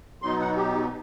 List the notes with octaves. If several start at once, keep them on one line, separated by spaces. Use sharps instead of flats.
B2 F#3 B3 D#4 C6
F#5
G4